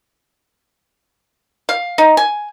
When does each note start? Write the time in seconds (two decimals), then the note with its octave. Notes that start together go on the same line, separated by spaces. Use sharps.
1.69 F5
1.98 D#4
2.17 G#5